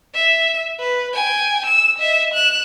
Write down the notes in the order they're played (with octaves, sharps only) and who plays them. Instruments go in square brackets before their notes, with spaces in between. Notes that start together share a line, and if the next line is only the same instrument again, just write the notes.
[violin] E5
B4
G5 G#5
E6 E7
D#5 E5
F#6 E7